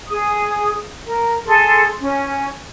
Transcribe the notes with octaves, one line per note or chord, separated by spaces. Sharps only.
G#4 D#6
A#4
G#4 A4 C6
C#4